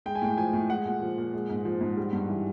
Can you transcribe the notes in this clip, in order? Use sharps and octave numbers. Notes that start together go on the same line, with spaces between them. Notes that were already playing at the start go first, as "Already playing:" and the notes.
G#3 G5
G#5
A2 G5
F3 G#5
A2
G#3 F#5
A#2
F3
A#2
G#3
G#2
F3
G#2
G3
G2
E3